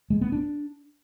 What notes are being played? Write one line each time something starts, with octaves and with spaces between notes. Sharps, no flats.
G#3
B3
D4